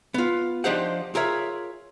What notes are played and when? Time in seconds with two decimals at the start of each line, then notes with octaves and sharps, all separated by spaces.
0.14 B3 F4
0.64 F3 D4 D#4 G4 C5 F#5
1.15 F4 G#4 A#4 C#5 E5